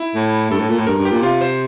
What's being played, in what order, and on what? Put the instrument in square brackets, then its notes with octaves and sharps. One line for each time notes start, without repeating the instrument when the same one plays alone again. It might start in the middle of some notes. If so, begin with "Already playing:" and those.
Already playing: [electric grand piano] E4
[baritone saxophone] A2
[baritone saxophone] G2 [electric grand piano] A4
[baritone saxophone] A2
A#2
A2
[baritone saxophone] G2 [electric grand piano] A#4
[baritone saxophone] G2
[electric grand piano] G4
[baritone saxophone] A#2
[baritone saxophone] C3 [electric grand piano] F4
[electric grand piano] C5